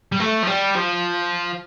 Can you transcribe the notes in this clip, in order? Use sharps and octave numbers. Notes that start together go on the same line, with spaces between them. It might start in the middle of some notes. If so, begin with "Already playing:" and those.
G3
A3
F3
G3
F3